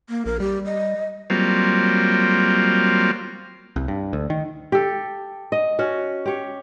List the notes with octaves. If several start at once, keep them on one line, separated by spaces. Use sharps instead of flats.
A#3
A#1 A#4
G3 G4
D#5
F#3 G3 A#3 C4 F4
C2
G2
D2
D#3
G4 A4
D#5
C#4 F#4
G4 C#5